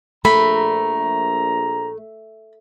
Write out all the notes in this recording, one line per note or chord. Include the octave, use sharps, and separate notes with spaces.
A#1 A3 A#5 B5